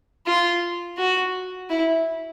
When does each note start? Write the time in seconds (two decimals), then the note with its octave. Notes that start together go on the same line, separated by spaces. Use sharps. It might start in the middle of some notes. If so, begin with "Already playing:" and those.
0.26 F4
0.97 F#4
1.70 E4